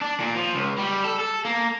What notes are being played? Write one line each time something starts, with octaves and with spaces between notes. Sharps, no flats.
D4
A#2
F3
C#2
G3
A4
A4
A#3